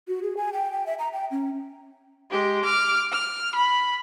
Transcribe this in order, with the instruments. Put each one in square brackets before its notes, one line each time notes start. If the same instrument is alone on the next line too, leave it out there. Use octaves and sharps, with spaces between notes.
[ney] F#4
G#4
G#5
G5
G5
E5
A#5
G5
C#4
[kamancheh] G#3 G4
D6 F6
F6
B5